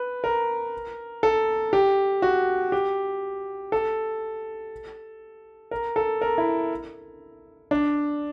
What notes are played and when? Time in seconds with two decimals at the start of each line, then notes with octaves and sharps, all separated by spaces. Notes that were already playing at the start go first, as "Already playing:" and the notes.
Already playing: B4
0.24 A#4
1.23 A4
1.73 G4
2.22 F#4
2.72 G4
3.72 A4
5.71 A#4
5.96 A4
6.21 A#4
6.38 E4
7.71 D4